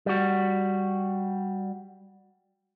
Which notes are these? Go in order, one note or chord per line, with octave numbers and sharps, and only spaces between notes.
G3 F#4